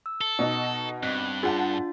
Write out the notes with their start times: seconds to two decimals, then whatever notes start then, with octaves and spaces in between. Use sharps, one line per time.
0.06 E6
0.21 A4
0.39 B2 D#4
1.03 G2 C4 F#6
1.43 D4 F4 G#4 F#5 A5 A6